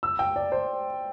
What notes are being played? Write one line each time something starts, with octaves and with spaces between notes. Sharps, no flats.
E6
G5
D5
C5